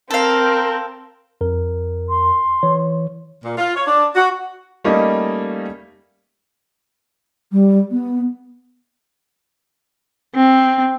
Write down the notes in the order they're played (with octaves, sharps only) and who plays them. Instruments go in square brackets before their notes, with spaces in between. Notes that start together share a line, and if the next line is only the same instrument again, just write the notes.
[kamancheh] C4 A#4 [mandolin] A4 F5
[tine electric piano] F2 A#4
[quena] C6
[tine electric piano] E3 C#5
[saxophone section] A#2
F4
C#5
D4
F#4
[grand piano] G3 A3 A#3 C#4 D#4 D#5
[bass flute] G3
B3
[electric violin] C4